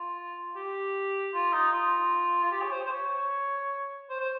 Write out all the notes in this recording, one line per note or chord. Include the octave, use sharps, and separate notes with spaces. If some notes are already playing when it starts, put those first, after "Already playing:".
Already playing: F4
G4
F4
D#4
F4
F4
G4
C#5
C5
C5
C#5
C5
C5